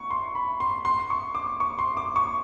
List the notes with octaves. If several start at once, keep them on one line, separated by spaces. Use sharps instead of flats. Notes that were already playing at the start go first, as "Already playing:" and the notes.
Already playing: C#6
C6
B5
C6
C6
C#6
D6
C#6
C6
D6
C#6